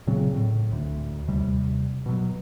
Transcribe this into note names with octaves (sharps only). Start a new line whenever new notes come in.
A#2 C#3 F#3 C4
A2
D2
D#2 C3 G3
B2 F#3